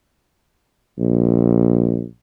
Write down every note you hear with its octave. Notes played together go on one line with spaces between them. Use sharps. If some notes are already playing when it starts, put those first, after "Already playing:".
A#1